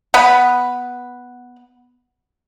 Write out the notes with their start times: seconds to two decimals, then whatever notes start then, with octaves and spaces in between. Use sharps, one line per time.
0.14 B3 B4